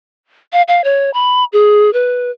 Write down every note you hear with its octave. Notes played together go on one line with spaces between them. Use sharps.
F5
F5
C#5
B5
G#4
B4